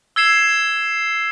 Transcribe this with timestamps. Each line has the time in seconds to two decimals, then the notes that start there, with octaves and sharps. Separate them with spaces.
0.16 E6 G#6 C7 E7